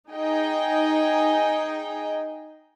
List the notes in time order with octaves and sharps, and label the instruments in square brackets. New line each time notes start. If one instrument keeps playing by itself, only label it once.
[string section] D#4 G#4 D#5 G5